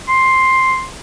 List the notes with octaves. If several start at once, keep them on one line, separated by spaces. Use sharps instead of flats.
C6